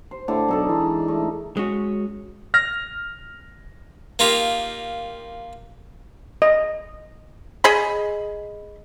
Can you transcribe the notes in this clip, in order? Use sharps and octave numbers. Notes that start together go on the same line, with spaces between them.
C5
A2 D3
B1 D#4 A4 D5
E3 G#3
A3 D#4
G#3 C#4 F#4
F6 A#6
A#3 D#4 F4 G4
D#5
G#4 D#5 B5